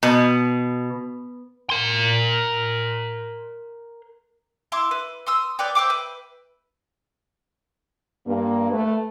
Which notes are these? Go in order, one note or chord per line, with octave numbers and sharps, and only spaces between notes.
B2
A#4 C6
E4 C6 D6
B4
C6 D#6 E6
B4 C#5 D5 G5
C5 E5 G5 D6
B4
G2 A#3
A3 B4